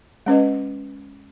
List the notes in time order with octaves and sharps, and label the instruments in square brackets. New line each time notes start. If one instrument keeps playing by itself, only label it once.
[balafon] G#3 C#4 B4 D#5